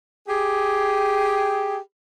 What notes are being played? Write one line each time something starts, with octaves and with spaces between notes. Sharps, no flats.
G4 G#4